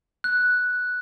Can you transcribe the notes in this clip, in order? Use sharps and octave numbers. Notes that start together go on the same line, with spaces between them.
F#6